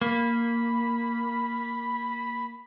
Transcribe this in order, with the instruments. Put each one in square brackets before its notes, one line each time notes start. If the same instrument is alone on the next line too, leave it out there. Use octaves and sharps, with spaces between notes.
[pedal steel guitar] A#3 [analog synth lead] B5